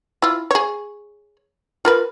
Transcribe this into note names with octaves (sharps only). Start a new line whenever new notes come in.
E4 F4
G#4 C#5
F4 A#4 B4